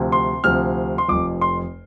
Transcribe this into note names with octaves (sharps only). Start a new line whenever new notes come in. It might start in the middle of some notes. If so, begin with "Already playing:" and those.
Already playing: D2 C3 F3
C6
D2 C3 F3 F6
C6
F1 F2 F3 D6
C6